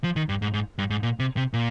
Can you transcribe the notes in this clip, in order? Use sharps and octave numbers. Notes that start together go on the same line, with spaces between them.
F3
D#3
G2
G#2
G#2
G2
G#2
A#2
C3
C3
A#2